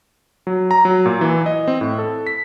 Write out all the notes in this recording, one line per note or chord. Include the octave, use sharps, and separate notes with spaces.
F#3
A#5
F#3
A#2
E3
D#5
C4
A2
A4
B6